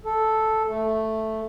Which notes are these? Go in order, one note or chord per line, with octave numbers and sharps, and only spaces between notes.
A4
A3